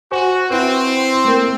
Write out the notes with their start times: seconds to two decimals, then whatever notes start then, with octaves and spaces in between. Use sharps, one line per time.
0.12 F#4 C5 G#5 C#6
0.51 C4 E4 B4
1.25 A3 A#3 A#4